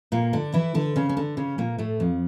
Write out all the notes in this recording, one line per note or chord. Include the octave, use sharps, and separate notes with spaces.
A#2 A#3
D3 D4
E3 E4
D3 D4
C#3 C#4
C#4
D3 D4
C#3 C#4
A#2 A#3
A2 A3
F2 F3